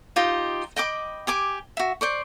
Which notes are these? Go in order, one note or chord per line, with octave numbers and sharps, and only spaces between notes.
D#4 F4 G4 D#5
D#5 G5 B5 D6
G4 G#5 D6
F#4 E5
C5 D5 C#6